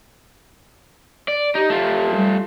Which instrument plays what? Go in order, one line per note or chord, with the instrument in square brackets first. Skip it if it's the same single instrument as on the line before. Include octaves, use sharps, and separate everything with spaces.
[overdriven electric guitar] D5
[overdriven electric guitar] D#4 [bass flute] G4
[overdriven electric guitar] A3 F4
[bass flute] G3